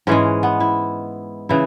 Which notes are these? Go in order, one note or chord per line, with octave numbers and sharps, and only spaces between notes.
G#2 E3 G#3 C#4
B3
E4
C#3 E3 E4